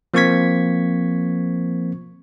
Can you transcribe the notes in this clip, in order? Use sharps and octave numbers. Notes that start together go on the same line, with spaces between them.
F3 A#3 C4 C#6 G#6 B6